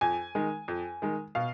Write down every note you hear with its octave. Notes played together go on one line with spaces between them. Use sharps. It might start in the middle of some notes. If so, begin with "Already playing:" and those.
F2 G#5
D#3 G#3
F2
D#3 G#3
B2 F5